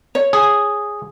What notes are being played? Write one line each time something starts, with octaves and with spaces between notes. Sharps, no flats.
C#5
G#4